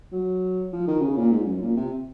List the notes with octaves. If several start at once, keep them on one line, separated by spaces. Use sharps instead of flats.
F#3
F3
D#3
C#3
A#2
G#2
F#2
A#2
C3